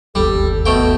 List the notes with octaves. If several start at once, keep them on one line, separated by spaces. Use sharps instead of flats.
D1 G1 D#2 G3 A4
B2 A3 G5